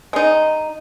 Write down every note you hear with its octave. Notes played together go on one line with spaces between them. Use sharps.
G#3 D#4